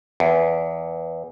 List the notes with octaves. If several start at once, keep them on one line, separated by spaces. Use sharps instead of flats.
E2